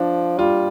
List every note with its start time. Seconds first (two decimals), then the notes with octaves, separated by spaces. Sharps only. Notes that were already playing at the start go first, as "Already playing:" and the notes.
Already playing: F3 D4
0.38 G3 F4